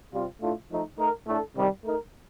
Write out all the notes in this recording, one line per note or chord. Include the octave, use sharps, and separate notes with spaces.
C3 G3 C4 F4
A2 A3 D4 F4
F3 A3 D#4
A3 D#4 A#4
A2 A3 D4 A4
C3 D#3 G3
A3 D#4 A#4